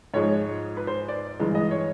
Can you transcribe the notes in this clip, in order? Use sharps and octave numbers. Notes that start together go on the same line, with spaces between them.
G#2 F3 G#3 C#5
B4
C5
D5
G2 E3 G#3
D#5
C#5